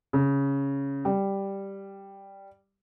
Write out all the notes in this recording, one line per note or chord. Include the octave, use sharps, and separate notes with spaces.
C#3
G3